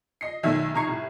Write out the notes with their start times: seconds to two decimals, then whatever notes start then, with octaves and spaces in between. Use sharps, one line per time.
0.21 D#5 C7
0.43 B1 D#3 A3 E5 G#6
0.74 C2 D#4 A#5 C#6 G#6 C7
0.87 C2 A2